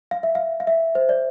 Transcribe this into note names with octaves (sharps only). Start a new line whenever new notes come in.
F5
E5
F5
F5
E5
C5
D5